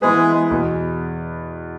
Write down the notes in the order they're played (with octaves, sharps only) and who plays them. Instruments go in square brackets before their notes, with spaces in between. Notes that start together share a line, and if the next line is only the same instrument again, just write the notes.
[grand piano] E3 B3 E4 B4 [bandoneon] G#3 G#4
[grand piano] E2 B2 B3